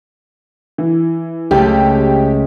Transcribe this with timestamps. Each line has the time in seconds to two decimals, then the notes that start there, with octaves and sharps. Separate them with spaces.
0.78 E3
1.51 C#2 A3 G4